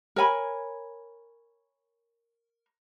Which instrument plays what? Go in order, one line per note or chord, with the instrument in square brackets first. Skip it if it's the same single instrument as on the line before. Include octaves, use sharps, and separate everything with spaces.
[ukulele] A#4 C#5 G#5 B5